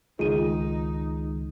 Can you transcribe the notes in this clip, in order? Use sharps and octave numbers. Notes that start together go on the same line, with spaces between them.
C#2 D#3 G#3 D#4 F4 D#7